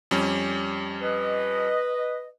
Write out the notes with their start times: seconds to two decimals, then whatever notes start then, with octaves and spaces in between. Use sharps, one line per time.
0.11 F2 G3 C#4
1.02 B4 D#5